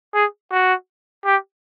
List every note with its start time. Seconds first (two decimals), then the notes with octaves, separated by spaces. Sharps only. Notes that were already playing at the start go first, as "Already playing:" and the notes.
0.14 G#4
0.52 F#4
1.25 G4